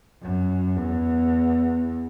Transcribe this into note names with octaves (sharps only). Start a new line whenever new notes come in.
F#2
E2